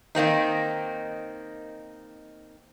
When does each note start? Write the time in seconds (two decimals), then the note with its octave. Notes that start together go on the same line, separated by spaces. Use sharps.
0.15 D#3 A#3 C4 D#4